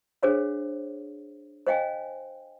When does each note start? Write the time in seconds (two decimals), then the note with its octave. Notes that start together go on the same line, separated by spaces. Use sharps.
0.23 D4 G#4 C5 C#5 F5
1.67 C5 D#5 F5 G5 G#5